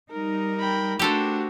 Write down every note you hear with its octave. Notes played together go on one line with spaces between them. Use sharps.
G3 D#4 A#4
G5 B5
A3 D4 F#4 G4 A4 C5